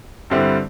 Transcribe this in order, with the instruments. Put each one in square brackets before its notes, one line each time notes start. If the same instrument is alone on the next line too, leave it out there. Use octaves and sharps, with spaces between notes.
[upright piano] G2 D3 G3 C4 E4